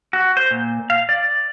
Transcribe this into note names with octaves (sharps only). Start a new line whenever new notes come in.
F#4
C5
A#2
F5
D5